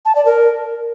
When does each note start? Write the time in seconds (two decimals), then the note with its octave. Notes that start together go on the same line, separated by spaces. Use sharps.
0.05 A5
0.15 D5
0.25 A#4